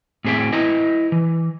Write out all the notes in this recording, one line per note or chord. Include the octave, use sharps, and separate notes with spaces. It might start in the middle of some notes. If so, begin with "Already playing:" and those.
A2 C4 G#4 E5 G5
E4 B4 D#5
E3